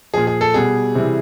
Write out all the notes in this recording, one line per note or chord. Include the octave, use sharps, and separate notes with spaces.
A#2 F3 G#4
G#4
A4
B2 G3 G#4
C3 E3 G3